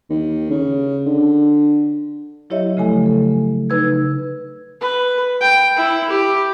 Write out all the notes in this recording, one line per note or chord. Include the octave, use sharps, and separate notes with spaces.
D#2
C#3
D3
F#3 E4 G4 C#5 D#5 E5
C#3 F3 A3 A4 G#5
A4
C#3 D#4 B4 E6 G#6
B4
G5
E4
G4